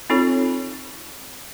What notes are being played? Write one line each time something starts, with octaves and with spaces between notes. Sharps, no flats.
C4 D#4 F4 A4 C#5